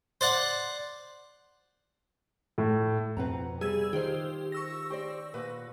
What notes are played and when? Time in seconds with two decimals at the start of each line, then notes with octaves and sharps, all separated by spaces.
0.21 C5 D5 F#5
2.58 A2
3.17 F2 B2 C4 B4 F#5 A#5
3.61 C3 G3 G#4 E6 G#6
3.93 D#3 F4 G4 C5
4.52 C#6 E6 A#6
4.90 G4 C5 D5
5.34 A#2 B4 F#5